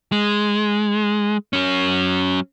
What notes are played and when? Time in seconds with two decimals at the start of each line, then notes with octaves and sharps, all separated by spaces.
0.12 G#3
1.53 F#3 C#4